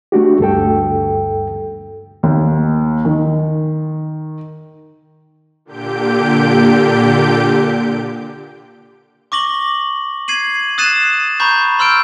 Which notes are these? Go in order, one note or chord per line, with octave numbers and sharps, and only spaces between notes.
A3 D4 F#4 G4
D2 G2 A4 G5
D#2
D#3
A#2 D3 G4 G6 D7
C#6 D6 A#6 F#7 G7
G#6 C7 D#7 F#7
D#6 F#6 A6 C7 D#7 E7
A#5 B5 C#6 G6
B5 C6 E6 F6 G6 D7